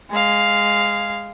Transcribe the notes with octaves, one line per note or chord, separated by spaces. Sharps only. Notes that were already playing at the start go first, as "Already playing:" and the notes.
G#3 F5